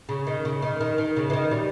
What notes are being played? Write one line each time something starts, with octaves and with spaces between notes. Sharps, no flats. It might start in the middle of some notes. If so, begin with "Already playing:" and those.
C#3
D#3
C#3
D#3
D#3
D#3
C#3
E3
D#3
G3